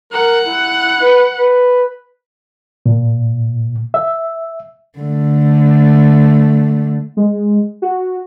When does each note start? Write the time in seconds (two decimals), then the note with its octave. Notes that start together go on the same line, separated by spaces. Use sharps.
0.13 A#4 F#5
0.46 E4
1.01 B4
1.38 B4
2.86 A#2
3.94 E5
4.99 D3 A3
7.17 G#3
7.82 F#4